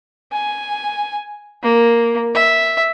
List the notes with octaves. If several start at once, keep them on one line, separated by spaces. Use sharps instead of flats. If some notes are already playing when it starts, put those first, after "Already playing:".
G#5
A#3
E5